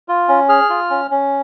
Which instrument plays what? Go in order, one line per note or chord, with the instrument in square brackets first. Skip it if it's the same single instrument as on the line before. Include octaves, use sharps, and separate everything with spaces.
[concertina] F4
C#4
G#4 F6
F4
C#4
C#4